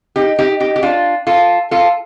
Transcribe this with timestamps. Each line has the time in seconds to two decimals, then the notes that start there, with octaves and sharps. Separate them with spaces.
0.16 D#4 G4
0.39 D#4 G4
0.60 D#4 G4
0.76 G4
0.83 D4 F4
1.27 F4 A4
1.71 F4 A4